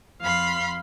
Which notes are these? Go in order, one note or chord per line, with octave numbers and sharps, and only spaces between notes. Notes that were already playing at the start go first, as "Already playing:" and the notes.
F2 F5 B5 C6